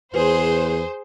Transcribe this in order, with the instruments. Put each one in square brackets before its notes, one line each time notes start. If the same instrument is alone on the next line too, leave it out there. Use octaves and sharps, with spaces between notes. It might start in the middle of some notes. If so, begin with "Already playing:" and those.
[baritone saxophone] E2 [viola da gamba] G#4 [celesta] B4 [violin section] C5